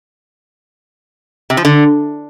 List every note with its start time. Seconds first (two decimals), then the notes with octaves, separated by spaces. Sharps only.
1.50 C3
1.57 F3
1.65 D3